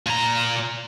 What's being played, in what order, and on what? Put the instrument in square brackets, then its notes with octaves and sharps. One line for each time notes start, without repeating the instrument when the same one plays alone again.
[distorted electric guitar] A#2 A#5